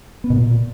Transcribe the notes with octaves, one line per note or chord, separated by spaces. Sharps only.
B3
B2
A#2